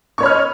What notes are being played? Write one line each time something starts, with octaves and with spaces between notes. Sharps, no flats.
C#5 D#5 B5 C#6 F6